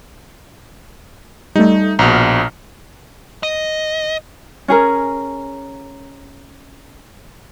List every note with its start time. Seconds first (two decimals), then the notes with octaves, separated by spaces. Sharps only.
1.56 G3 A3 D#4
1.99 A#1 B2 A#5 F6
3.43 D#5
4.68 C#4 G#4 A#4